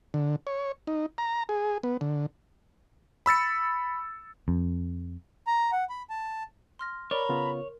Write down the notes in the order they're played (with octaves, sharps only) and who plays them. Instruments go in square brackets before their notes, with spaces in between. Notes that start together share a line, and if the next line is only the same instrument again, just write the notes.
[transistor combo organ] D3
C#5
D#4
A#5
G#4
B3
D3
[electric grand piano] B5 E6 A6 C#7
[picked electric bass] F2
[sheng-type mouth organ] A#5
F#5
B5
A5
[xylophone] C6 F6 A#6
[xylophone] A#4 [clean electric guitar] C#5 [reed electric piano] D5 [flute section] A#5 B5
[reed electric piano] C#3 B3 F4